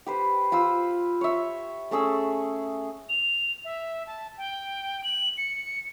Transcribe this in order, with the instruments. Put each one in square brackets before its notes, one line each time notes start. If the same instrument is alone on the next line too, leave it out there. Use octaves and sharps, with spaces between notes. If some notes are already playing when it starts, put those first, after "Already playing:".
[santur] G4 B4 C5
F4 C5 B5 E6
C#5 E5
A3 C#4 G#4 E6
[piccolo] F7
E5
A5
G5
F#7
C#7